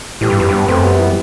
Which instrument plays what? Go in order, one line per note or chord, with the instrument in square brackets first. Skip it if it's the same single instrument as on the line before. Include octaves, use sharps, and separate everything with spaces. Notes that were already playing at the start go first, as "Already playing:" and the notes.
[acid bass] A2 [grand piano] E3 G3
[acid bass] G2
[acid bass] F#2 [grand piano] G3 B3
[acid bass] G2 [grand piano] G3 B3
[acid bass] F#2 [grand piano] A3 C4
[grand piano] G3 B3
E3 G3